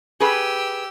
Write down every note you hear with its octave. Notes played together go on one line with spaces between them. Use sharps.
G4 G#4 B4 E6